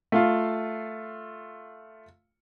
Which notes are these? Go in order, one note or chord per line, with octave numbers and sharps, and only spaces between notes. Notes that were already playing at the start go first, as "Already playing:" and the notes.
A3 F4 F5